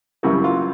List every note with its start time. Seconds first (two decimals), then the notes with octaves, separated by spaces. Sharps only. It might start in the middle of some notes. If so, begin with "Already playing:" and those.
0.23 F#2 C#3 E3 G3 A#3 F#4
0.44 F4